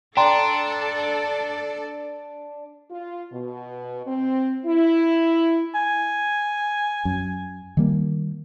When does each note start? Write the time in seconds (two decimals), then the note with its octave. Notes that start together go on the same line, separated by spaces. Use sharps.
0.17 D4 A4 D5 G5 A#5 C6
2.90 F4
3.32 B2
4.07 C4
4.65 E4
5.75 G#5
7.05 F#2
7.77 D#3 G3 A#3